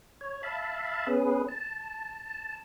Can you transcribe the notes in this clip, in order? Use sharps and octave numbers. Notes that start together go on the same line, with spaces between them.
C#5
E5 F5 A5 B5
B3 C#4 G#4 B4
A5